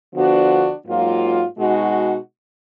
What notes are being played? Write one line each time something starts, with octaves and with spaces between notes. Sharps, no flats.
D3 F3 B3 D4 F#4
G#2 F#3 A#3 F4
B2 G#3 D#4 F#4